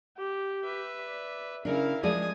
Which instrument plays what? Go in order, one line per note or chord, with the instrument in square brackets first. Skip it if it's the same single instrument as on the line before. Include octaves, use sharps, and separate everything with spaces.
[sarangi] G4
[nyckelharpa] B4 E5
[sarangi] D5
[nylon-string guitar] C#3 D4 [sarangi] E4 [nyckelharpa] A#4 F5
[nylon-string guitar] F3 G#3 D5 [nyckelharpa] G#5 D#6